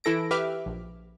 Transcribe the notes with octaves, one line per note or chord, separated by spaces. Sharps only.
E3 E4 A4 A#6 D7
G4 B4 E5 D6 F6
A#1